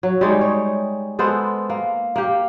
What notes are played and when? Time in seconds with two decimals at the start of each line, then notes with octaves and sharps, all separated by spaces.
0.03 F#3
0.21 G3 G#3 D#4
0.41 C#5
1.19 G#3 B3 A4 C5
1.70 A#3
2.16 A#3 G4